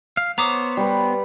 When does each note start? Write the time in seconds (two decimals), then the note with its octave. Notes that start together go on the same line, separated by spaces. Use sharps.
0.17 F5
0.38 B3 C5 C#5 A#5 D6 D#6
0.77 G3 B4